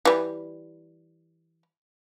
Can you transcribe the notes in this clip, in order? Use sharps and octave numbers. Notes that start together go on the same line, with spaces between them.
E3 G3